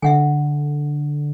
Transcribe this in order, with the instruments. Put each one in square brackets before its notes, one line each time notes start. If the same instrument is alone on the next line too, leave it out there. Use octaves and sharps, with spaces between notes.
[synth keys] D3 [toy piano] E5 F#5 G#5